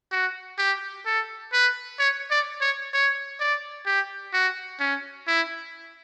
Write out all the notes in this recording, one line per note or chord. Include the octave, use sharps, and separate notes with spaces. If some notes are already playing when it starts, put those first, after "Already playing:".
F#4
G4
A4
B4
C#5
D5
C#5
C#5
D5
G4
F#4
C#4
E4